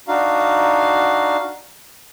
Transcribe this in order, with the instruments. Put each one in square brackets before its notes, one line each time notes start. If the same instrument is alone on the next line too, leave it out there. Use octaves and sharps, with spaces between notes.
[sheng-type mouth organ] D4 D#4 F#4 F5